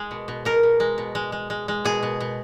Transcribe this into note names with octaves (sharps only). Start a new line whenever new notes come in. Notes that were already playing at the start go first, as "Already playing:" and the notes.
Already playing: G#3 G#4
B2
B2
B2 A#4
B2
G#3
B2
G#3
G#3
G#3
G#3
B2 G#4
B2
B2